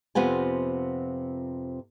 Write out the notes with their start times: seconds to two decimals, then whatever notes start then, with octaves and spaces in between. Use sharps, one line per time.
0.15 F2 C3 B3 F4 G#5